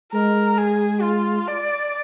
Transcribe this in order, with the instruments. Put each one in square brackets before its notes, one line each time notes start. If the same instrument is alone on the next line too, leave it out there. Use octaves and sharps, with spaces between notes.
[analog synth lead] G#3 [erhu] A#4
[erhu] G#4
F4
D5